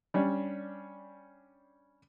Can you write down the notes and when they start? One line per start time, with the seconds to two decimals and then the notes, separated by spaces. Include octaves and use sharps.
0.14 G3 C#4 D4